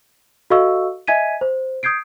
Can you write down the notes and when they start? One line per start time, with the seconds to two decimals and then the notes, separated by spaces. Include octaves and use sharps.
0.50 F#4 A4 D#5 F5 C#6 E6
1.07 D#5 E5 G#5 G#6 B6 D#7
1.41 C5
1.83 D#6 G6 G#6 C7 D7